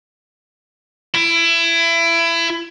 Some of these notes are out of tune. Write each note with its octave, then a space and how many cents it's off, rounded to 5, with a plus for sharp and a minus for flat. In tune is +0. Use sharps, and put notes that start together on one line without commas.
E4 +25